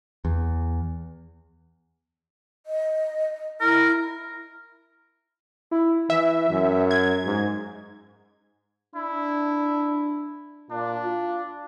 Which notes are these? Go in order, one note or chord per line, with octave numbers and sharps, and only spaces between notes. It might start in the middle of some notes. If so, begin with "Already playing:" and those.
E2
D#5
E4 A#4
E4
E3 E5
F#2
G#6
G#2
D4 E4
A#2 D4
F4